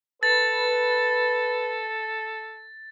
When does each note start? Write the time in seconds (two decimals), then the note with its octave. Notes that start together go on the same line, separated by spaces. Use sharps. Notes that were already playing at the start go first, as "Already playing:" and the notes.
0.23 A4 B4 A6